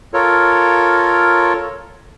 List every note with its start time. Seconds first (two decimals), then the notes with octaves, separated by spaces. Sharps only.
0.14 F4 A4 A#4 C#5